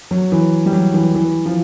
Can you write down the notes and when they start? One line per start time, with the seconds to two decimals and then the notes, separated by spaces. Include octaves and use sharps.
0.11 F#3
0.32 E3
0.66 G3
0.72 F#3
0.94 E3
1.15 E3
1.46 F3